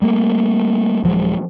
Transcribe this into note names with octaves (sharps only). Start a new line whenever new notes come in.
G3 A3 A#3
D#1 F3 F#3 G#3